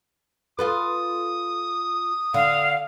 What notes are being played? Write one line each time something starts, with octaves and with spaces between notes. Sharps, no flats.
F4 A4 B4 D#6
D3 F5